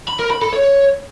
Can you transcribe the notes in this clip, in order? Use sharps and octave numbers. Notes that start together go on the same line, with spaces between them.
B5
A#4
B5
A4
C#5